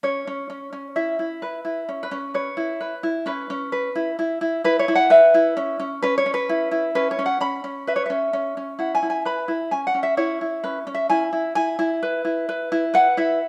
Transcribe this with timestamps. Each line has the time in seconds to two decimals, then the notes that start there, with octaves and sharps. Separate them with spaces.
0.03 C#4 C#5
0.27 C#4
0.50 C#4
0.73 C#4
0.96 E4 E5
1.19 E4
1.42 B4
1.65 E4
1.89 C#4
2.03 B4
2.11 C#4
2.34 B4 C#5
2.57 E4
2.80 B4
3.03 E4
3.26 C#4 B4
3.50 C#4
3.72 B4
3.95 E4
4.19 E4
4.41 E4
4.64 E4 B4
4.79 C#5
4.88 E4
4.95 F#5
5.10 B4 E5
5.34 E4
5.57 C#4
5.79 C#4
6.02 C#4 B4
6.18 C#5
6.26 C#4
6.34 B4
6.49 E4
6.71 E4
6.95 C#4 B4
7.11 C#5
7.19 C#4
7.26 F#5
7.41 C#4 B5
7.64 C#4
7.87 B4 E5
7.96 C#5
8.06 C#4 E5
8.33 C#4
8.57 C#4
8.79 E4 F#5
8.95 G#5
9.03 E4
9.10 G#5
9.25 B4 B5
9.48 E4
9.71 C#4 G#5
9.87 F#5
9.94 C#4
10.03 E5
10.17 E4 C#5
10.41 E4
10.64 C#4 B4
10.87 C#4
10.94 E5
11.10 E4 G#5
11.33 E4
11.55 E4 G#5
11.79 E4
12.03 B4
12.25 E4
12.49 B4
12.72 E4
12.94 B4 F#5
13.17 E4 E5